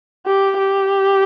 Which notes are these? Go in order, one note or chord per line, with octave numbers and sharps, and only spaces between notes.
G4
G4